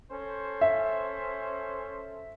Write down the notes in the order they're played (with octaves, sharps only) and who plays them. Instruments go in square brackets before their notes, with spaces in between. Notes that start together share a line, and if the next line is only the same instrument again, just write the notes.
[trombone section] C#4 A4 C5
[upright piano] E5